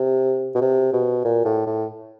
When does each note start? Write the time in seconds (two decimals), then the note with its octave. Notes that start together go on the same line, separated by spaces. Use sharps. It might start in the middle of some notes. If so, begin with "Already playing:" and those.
Already playing: C3
0.55 B2
0.61 C3
0.93 B2
1.25 A#2
1.45 A2
1.67 A2